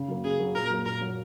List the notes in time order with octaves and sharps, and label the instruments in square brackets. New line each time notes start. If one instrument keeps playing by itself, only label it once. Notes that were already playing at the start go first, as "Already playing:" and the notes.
Already playing: [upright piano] C#3
F#3 A#3
[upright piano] C#3 [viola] G#4
[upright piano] F#3 A#3
[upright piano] A#2 [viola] A#4
[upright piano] F#3 A#3
[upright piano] A#2 [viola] A#4
[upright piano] F#3 A#3